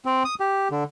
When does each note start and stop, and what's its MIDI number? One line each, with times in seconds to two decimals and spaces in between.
0.05 0.23 60
0.25 0.35 87
0.40 0.68 67
0.71 0.84 50